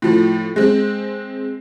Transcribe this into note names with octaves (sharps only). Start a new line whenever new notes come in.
A2 F3
G#3 C4